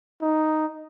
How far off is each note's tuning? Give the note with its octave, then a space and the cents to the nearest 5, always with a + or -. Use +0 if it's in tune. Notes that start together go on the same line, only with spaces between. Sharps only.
D#4 +0